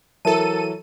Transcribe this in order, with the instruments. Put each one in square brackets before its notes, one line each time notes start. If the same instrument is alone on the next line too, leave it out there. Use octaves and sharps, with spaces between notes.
[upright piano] E3 F#3 [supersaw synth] A4 D#7 [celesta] A#4 E5 A5